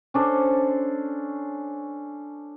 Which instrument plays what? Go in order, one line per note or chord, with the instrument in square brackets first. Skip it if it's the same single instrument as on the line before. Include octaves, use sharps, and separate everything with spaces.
[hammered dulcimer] C#4 D4 A4 C5